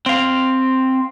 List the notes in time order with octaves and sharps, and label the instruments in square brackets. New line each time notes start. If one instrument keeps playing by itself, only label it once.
[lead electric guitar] C4 F5